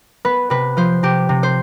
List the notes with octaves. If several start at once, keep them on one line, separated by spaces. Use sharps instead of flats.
B3 B4
C3 B4
F3 C5
C3 G4
C3
C5